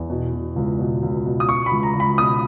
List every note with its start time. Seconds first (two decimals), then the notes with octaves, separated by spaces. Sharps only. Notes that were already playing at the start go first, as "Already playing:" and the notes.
Already playing: E2
0.10 B2
0.33 B2
0.56 C#2
0.79 B2
1.02 C#2
1.25 B2
1.40 D#6
1.48 B2 C#6
1.66 B5
1.71 C#2
1.83 A#5
1.95 C#2 B5
2.18 B2 D#6